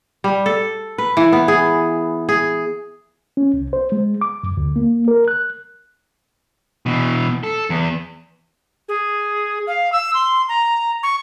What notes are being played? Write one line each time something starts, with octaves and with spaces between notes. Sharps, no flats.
G3
A4
B4
E3
B3
G#4
G#4
C#4
C2
C5
G#3
D6
F#2
D2
A#3
A#4
F#6
B2 E3
A4
E2
G#4
F5
E6
C6
A#5
C#6